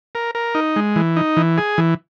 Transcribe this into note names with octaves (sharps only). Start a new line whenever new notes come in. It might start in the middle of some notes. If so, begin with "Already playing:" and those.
A#4
A#4
D#4
G#3
E3
D#4
E3
G#4
E3